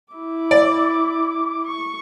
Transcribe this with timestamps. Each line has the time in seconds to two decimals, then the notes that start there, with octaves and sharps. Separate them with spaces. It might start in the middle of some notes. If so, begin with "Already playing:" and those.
0.13 E4 D6
0.51 D5
1.67 C#6